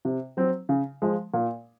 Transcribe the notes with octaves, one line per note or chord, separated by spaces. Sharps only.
C3
F#3 C4
C#3
F3 G#3
A#2